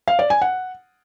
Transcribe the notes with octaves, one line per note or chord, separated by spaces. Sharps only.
F5
D5
G#5
F#5